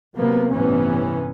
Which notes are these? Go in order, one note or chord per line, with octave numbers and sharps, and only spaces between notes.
C3 F#3 A#3 B3
A1 G2 C3 E3 B3 C#4